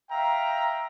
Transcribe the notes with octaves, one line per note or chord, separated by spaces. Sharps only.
E5 F5 G5 A#5